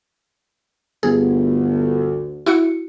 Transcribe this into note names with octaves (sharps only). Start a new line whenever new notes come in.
G1 D2 G#4
E4 F#4 C#7